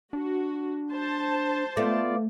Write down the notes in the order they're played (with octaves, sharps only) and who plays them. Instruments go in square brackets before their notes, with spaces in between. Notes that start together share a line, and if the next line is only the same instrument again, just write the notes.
[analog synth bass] D4 [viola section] F#4
[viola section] C5 A5
[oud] A3 [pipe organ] B3 F4 D5